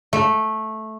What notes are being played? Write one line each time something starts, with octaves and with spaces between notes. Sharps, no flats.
A3